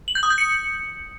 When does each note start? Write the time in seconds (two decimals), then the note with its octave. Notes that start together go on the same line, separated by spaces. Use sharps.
0.08 F#7
0.15 G6
0.23 D#6
0.30 G6
0.38 C#7